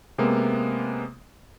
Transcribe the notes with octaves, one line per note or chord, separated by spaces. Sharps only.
C3 G#3 A#3 B3